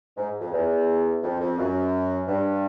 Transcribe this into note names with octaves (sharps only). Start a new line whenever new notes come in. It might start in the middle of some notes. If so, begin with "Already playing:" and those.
G#2
F2
E2
F2
F2
F#2
G2